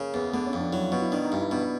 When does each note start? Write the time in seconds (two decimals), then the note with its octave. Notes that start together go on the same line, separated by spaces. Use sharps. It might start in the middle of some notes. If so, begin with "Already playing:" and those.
Already playing: C#3 A#3
0.14 E2
0.33 D3 B3
0.47 C#4
0.53 F2
0.60 D4
0.72 F#3 E4
0.82 F4
0.92 B2 F#4
1.02 E4
1.12 D#3 D4
1.25 D#4
1.32 G2
1.38 E4
1.51 B2 D4